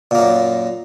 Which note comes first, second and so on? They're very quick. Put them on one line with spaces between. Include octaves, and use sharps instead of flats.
A#2 A#3 F#2